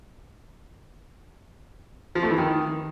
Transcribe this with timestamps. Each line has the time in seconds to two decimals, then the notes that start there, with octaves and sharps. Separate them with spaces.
2.15 F3
2.23 A3
2.31 E3
2.38 D#3